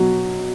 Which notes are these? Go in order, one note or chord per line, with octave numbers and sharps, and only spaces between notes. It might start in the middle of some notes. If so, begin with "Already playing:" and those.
Already playing: B2 F#3